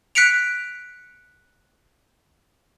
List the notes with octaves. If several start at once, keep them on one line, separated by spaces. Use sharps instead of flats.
F#6 B6 C#7 D7 F7